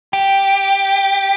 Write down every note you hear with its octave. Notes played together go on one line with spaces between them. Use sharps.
G4